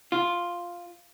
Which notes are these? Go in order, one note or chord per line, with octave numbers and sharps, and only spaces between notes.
F4